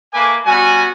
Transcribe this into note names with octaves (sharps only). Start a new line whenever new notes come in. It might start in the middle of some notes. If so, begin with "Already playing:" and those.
A3 A#3 B4 G#5 D6
G3 B3 C#4 F#4 G#5